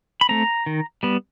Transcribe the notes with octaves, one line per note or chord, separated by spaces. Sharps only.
B5
A3 C4 A#5
D#3
G3 B3